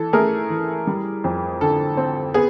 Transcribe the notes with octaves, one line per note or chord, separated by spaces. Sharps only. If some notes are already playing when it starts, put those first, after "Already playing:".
Already playing: E3 A4
A3 G#4 A#4
E3
G3
F2
D3 A4
C4
B3 G#4